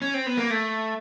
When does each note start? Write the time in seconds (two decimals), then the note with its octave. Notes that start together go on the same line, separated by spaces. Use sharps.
0.02 C#4
0.14 C4
0.26 B3
0.37 A#3
0.50 A3